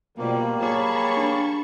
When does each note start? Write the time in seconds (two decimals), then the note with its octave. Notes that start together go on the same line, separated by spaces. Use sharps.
0.18 B2 F3 G3 A#3
0.61 G4 G#4 C#5 A5 B5 C#6
1.17 D4